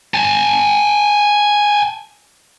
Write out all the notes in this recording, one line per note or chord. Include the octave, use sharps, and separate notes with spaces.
G#5 A5